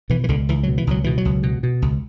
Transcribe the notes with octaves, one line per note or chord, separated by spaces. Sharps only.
B2 E3
E3
C#2 D3
C#2 E3
F#3
B2
E3
C#2 F#3
B2 E3
F#3
C#2
B2
B2
C#2